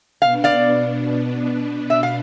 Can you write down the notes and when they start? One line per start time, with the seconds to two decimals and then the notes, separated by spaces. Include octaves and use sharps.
0.22 B2 B3 D4 F5
0.44 D5 F5
1.90 E5
2.03 F5